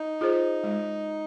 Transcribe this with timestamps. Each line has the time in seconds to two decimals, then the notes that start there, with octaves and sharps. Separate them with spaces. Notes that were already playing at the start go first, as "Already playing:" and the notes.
Already playing: D#4
0.21 F4 G#4 C5
0.64 G#3